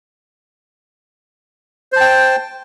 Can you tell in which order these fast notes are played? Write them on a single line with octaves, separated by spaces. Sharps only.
C5 A5 G5